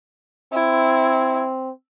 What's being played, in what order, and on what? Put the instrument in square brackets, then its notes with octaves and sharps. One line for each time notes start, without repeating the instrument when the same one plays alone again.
[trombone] C4 [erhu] E4